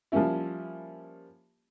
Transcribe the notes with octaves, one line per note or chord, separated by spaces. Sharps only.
F3 G3 A#3 C#4 E4